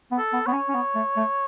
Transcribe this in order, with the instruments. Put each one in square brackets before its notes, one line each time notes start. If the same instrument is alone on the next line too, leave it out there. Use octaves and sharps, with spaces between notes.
[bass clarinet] B3
[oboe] A4
[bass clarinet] B3
[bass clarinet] B3 [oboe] C#5
[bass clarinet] C#4
C#4
B3
A3
A3